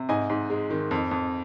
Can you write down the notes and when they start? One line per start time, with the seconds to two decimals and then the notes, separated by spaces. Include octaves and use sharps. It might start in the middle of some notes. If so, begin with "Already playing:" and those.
Already playing: C3
0.09 G#2 D#5 G#5
0.30 G#2
0.50 G#3
0.70 D#3
0.91 F2
1.11 F2